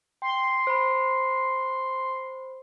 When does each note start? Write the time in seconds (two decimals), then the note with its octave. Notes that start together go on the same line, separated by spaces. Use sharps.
0.22 G5 C6
0.67 C5 B5